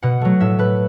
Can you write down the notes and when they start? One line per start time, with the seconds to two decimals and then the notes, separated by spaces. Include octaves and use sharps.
0.03 B2 F#5
0.21 F#3 A3
0.40 A2 E5
0.59 A3 B4